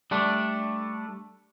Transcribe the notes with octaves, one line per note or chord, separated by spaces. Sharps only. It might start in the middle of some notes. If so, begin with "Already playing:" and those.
G3 A3 D4